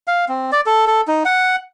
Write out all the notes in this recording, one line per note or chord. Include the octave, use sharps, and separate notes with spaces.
F5
C4
D5
A4
A4
D#4
F#5